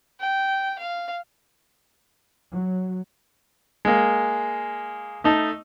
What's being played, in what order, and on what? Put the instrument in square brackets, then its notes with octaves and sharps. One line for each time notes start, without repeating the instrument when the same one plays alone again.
[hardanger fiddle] G5
F5
[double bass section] F#3
[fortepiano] G#3 A#3
A3 D#4 A5